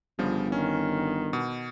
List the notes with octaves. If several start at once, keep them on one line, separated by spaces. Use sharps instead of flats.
G1 C#3 F3 G3
D#3 C#4
B2